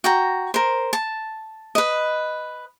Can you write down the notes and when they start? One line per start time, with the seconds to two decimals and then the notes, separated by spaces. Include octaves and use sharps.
0.04 F#4 G5 A#5
0.54 A#4 C5
0.93 A5
1.75 B4 D#5